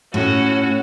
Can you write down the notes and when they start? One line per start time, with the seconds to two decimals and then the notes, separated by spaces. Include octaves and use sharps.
0.14 A2 C#4 F#4